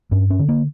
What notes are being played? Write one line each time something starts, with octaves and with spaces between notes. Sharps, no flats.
G2 C#4
C#4
D3
A#3